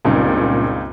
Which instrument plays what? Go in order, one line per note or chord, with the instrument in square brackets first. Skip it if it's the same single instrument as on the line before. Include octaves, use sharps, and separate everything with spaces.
[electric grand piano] C#2 C4 D#4 [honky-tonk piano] G2 A#2 C#3